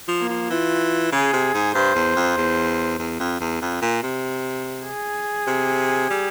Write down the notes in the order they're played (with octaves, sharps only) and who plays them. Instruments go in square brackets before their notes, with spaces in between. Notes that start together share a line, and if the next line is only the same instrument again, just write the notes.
[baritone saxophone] F3
[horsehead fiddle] A#3
[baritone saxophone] F3
[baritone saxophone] E3 [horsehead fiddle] F4
[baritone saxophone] C#3 [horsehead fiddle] G#4
[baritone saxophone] C3
G#2
[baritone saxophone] G2 [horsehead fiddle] C5
[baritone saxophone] E2
F2
E2
E2
F2
E2
F2
A#2
C3
[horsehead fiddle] G#4
[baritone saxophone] C3
G3